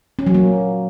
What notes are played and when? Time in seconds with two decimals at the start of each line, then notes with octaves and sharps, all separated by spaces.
0.19 C#4
0.27 F#3
0.34 A#3